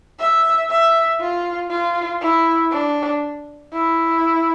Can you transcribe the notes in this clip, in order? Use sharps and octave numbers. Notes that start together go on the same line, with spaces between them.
E5
E5
F4
F4
E4
D4
E4